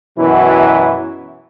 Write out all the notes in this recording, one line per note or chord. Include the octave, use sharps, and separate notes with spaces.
F#2 B2 E3 F#3 E4 F#4